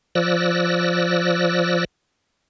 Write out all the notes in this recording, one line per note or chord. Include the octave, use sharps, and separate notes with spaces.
F3 D5 E6 F#6 A#6